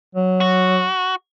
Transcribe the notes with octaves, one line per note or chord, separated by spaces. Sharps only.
F#3
F#4